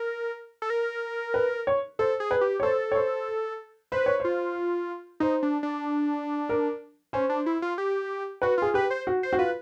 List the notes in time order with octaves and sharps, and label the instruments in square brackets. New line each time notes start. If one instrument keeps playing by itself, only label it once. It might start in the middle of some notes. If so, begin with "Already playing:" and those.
Already playing: [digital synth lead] A#4
A4
A#4
[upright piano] B4
C#5
[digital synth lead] A4 [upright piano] C5
[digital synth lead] G#4
[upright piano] B4
[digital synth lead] G4
[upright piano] C#5
[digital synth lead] A4 [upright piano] C5
[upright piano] C#5
C5
[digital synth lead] B4 [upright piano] C5
[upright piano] C#5
[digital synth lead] F4 [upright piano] C5
[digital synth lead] D#4 [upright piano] C5
[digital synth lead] D4
D4
[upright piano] A#4
[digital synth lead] C#4 [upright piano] C5
[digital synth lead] D4
E4
F4
G4
[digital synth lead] F#4 [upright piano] B4
[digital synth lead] F4 [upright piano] G#4
[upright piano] G4 [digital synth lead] B4
[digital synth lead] C5
[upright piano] F#4
[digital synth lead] C5
[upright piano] F#4
[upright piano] F4 [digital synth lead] B4